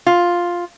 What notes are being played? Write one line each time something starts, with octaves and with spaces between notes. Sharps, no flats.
F4